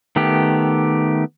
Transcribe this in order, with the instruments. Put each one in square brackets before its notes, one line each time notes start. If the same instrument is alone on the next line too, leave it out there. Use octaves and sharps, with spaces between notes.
[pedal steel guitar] D#3 A3 B3 G4